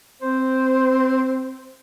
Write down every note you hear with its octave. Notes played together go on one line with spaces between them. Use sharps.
C4 C5